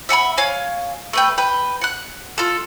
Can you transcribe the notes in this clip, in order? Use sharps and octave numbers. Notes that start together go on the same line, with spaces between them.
E5 F#5 G#5 B5
C#5 F5 G#5
A3 B4 G5
B4 G5
F#5 F#6
F4 A4